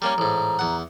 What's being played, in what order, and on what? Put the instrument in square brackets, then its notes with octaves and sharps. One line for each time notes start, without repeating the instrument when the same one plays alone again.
[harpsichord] G3 A#3 C#4 [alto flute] A#5
[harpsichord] A1 G#2
E2 F#5